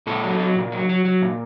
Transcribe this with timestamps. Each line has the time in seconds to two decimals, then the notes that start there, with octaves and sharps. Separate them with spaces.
0.07 A#2 A4
0.24 F#3
0.40 F#3
0.56 A#2
0.72 F#3
0.89 F#3
1.05 F#3
1.22 A#2